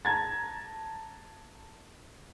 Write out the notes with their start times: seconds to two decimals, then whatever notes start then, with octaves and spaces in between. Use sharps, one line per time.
0.05 A5 A#5 G#6 A6